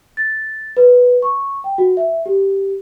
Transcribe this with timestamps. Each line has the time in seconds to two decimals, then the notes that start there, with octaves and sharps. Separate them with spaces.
0.17 A6
0.77 B4
1.22 C#6
1.64 G5
1.78 F#4
1.97 E5
2.26 G4